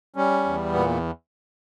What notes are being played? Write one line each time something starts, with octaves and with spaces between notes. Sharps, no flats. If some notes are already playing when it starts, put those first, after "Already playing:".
G3 C#4
E2
A#2 B3